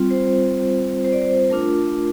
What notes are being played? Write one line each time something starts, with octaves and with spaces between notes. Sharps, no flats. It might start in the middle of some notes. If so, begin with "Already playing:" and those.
Already playing: G3 C4 F4
C5
C5
D5
C5
A3 D4 F4 A#4